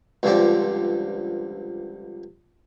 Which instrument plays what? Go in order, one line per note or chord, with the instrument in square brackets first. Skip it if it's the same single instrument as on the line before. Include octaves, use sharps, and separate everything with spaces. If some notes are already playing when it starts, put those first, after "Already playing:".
[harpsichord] C#2 G2 D3 F3 C4 D5